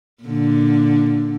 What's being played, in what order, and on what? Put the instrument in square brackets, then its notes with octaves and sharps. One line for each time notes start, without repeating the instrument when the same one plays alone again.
[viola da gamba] A#2 D3